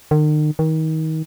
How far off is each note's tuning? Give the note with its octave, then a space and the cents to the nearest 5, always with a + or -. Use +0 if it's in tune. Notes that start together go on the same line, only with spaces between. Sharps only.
D#3 -40
D#3 +30